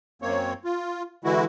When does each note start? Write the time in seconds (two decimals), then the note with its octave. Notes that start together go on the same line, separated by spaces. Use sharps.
0.22 F#2 A#3 C4 C#5
0.64 F4
1.24 D3 E3 G#3 E4 F#4